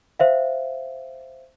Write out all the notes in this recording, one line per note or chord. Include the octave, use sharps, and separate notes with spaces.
C5 E5 F5